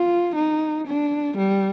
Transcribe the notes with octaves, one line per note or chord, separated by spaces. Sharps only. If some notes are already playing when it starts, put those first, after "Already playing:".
Already playing: F4
D#4
D4
G3